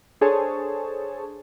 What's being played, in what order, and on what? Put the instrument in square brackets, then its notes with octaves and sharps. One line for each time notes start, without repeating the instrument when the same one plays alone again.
[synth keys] D4 G#4 A4 C5 C#5 A5